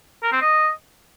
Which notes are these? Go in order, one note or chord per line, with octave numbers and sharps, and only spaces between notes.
A#4
C4
D#5